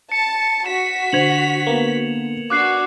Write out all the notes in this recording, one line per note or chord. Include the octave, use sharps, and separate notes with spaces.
A5 C#7
F#4 B6 E7
D3 C5 G#6 F7 F#7
A#3 B3
D4 F#4 D6 F#6 C7